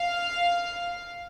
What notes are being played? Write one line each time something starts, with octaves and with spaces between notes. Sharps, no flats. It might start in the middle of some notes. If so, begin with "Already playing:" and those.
Already playing: F5